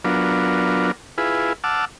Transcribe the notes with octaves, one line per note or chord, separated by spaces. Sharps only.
F#3 B3 D4 F4 A#4
E4 F4 G#4 B4
F#5 A5 D6 E6 F6